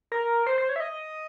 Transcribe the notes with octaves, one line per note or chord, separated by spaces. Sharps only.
A#4
C5
C5
C#5
E5
D#5